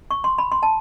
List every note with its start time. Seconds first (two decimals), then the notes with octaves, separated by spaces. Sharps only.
0.11 C#6
0.24 C6
0.38 B5
0.52 C6
0.63 A5